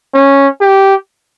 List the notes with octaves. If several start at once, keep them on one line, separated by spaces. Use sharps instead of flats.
C#4
G4